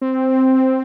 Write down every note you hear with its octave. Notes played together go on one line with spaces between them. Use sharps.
C4